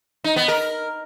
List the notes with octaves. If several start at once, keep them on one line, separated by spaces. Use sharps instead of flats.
D#4
B3
A#4